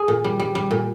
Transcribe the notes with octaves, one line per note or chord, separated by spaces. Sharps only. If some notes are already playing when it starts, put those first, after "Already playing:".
Already playing: G#4
A#2
G3
G3
G3
A#2